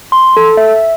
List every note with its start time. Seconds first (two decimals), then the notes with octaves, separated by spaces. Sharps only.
0.12 C6
0.37 A4
0.57 E5